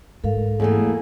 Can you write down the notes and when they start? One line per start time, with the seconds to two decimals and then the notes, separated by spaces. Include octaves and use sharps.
0.24 G#2 A4 A#4 F5
0.60 E2 A3 A#3 G#4